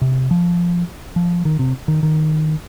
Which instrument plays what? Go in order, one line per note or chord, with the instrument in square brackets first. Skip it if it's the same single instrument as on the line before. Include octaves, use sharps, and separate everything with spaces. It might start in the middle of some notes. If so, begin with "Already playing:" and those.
[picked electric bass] C3
F3
F3
D#3
C3
D#3
D#3